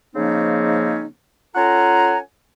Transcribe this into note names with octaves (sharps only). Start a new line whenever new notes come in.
C#3 F3 A#3 C4 C#4 D#4
C#4 F4 A4 F#5 G#5 A#5